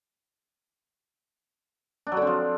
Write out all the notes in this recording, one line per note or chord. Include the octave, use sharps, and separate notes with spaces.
D4
F#3
D3
C4
F3